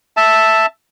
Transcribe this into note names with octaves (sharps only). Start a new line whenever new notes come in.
E5 A5